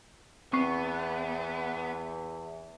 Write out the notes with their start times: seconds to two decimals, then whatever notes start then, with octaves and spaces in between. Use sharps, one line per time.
0.53 E2 B3 C4 C#6 C7